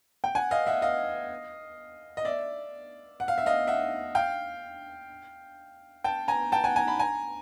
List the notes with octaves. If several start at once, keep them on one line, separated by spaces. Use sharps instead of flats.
G5
F#5 G#5
D#5 F5
E5 F#5
D#5 F5
D#5
D5 E5
F#5
F5
E5
D#5 F5
E5 F#5
F5 G5
G5 A5
G#5 A#5
G5 A5
F#5 G#5
G#5 A#5
A5 B5
G#5 A#5